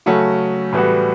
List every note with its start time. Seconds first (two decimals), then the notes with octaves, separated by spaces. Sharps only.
0.06 C#3 F#3 A3 C#4 F#4
0.72 A2 E3 G3 B3 F#4